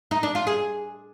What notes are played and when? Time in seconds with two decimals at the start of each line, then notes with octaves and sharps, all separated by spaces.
0.11 D#4
0.23 D4
0.35 F4
0.47 G#4